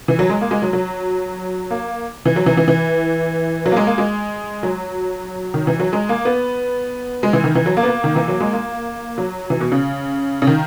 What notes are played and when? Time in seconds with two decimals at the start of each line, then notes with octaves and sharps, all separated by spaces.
0.08 E3
0.19 F#3
0.29 G#3
0.41 A#3
0.51 G#3
0.62 F#3
0.73 F#3
1.71 A#3
2.26 E3
2.36 F#3
2.46 E3
2.57 E3
2.68 E3
3.66 F#3
3.72 A#3
3.77 G#3
3.87 A#3
3.98 G#3
4.63 F#3
5.54 D#3
5.67 E3
5.80 F#3
5.93 G#3
6.09 A#3
6.25 B3
7.23 G#3
7.33 E3
7.44 D#3
7.55 E3
7.66 F#3
7.77 A#3
7.83 B3
7.87 A#3
8.04 D#3
8.16 E3
8.28 F#3
8.40 G#3
8.53 A#3
9.18 F#3
9.50 E3
9.60 B2
9.72 C#3
10.42 C#3
10.47 D#3